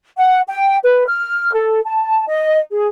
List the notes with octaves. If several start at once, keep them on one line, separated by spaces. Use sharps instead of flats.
F#5
G5
B4
F6
A4
A5
D#5
G#4